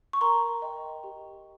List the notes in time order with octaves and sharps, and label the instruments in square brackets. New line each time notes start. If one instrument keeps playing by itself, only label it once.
[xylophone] C#6
A#4 A#5 C6
D#5 G5
G4